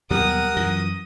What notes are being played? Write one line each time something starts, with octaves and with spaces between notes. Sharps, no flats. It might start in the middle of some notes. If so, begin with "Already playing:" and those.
D#2 B2 F#3 G3 A#4 F#5 D#6
F#2 E3 F3 A#6